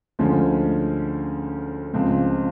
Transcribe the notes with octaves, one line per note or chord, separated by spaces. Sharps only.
D2 D3 F3 G#3 C#4
C#2 C#3 F3 G#3 C4